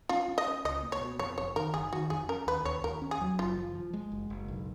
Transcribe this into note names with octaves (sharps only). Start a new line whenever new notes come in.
C#4 F4
C#4
D#5
C#4
C#2 D#5
A#3
C#5
B2
F2 C#5
F#1 C#5
D#3 A#4
F#1 G#4
D#3 F#4
F2 G#4
C#4 A#4
D#2 B4
D#2 C#5
D#2 A#4
C#4
G#4
F#3
F#1 F4
F3
F3
G#3
F#1
F#1
B1